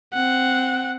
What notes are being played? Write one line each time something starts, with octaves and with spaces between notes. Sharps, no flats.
C4 F#5